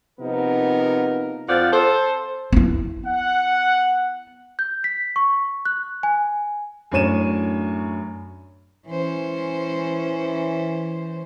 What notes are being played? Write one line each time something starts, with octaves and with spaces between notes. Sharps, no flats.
C3 F3 B3 D#4 A#4
F2 F3 D5 F5 F#5
A4 C5
B3 E4
F#5
G6
B6
C#6
F#6
G#5
F#2 A2 D4 C#5 D#7 E7
E3 C#4 C5